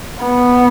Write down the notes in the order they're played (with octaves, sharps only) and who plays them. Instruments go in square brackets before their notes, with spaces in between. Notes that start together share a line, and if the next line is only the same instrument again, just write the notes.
[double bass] B3